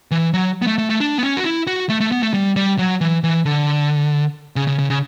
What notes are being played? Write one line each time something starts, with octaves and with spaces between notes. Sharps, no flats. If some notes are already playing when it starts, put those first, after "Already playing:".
E3
F#3
B3
A3
A3
A3
D4
B3
C#4
F#4
E4
F#4
A3
A3
B3
A3
G3
G3
F#3
E3
E3
D3
C#3
C#3
C#3
C#3